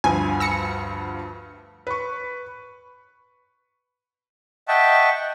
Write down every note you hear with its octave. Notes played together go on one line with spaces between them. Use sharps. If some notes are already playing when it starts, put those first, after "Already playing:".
D2 G2 F3 G#5
E6 A#6 C#7
B4 C#6
D#5 E5 F#5 G5 A5 C#6